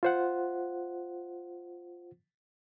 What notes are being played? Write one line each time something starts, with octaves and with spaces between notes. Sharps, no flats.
F4 C5 F#5